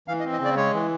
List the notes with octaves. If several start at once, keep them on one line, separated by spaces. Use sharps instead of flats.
E3 F5
D#5
C4
D#5
C#3 D5
G#3 C#5
E3